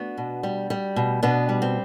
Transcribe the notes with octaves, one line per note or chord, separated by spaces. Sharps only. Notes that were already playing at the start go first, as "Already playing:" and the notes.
Already playing: B3 D4 F#4
B2
G3
G3
B2
B2 B3 D4
G3
C4